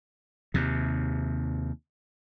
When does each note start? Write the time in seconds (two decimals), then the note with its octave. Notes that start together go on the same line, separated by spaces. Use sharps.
0.54 D#2 C3